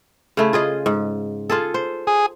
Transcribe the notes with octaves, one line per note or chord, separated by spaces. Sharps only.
C#3 A3 E4
F4 G#4 D#5
G#2
F4 G#4 A4
C5
G#4